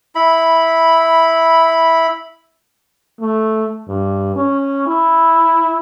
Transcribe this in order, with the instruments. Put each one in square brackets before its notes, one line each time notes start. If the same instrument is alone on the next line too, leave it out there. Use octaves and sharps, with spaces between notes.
[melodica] E4 B5
[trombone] A3
G2
C#4
E4